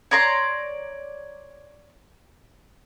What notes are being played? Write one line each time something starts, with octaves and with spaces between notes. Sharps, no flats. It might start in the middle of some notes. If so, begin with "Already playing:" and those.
C#5 D5 A#5 C6